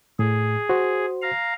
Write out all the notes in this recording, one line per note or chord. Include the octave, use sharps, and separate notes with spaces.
A2 G#4
F#4 C5
F5 A#5